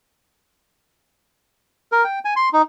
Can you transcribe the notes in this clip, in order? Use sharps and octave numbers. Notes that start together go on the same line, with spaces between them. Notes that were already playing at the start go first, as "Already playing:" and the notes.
A#4
G5
G#5
C6
D#4